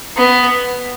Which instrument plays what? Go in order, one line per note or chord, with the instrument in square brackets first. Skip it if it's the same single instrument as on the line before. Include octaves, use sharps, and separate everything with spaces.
[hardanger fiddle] B3